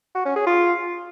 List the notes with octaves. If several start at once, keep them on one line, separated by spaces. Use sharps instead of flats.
F#4
C#4
G#4
F4